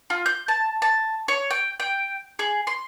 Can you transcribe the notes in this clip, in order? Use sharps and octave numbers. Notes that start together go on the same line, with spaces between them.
F4
G6
A5
A5
C#5
G5
G5
G#4
C6